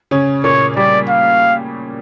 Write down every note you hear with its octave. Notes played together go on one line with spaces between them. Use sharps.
C#3 C#4
A#2 A#3 C#5
G3 D5
F5